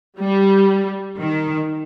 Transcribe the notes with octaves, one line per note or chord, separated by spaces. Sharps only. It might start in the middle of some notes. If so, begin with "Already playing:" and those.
G3
D#3